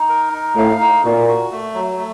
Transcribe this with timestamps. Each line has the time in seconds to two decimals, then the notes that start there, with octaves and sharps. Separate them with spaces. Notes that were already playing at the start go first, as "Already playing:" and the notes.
Already playing: D#4
0.09 A#4
0.33 D#4
0.56 A2 F5
0.80 D#4
1.04 A#2 F#4
1.28 F#4
1.51 A3
1.74 F#3
1.98 A3